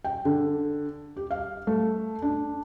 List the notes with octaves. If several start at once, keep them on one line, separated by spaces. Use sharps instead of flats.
G5
D3
G4
F5
A3
D4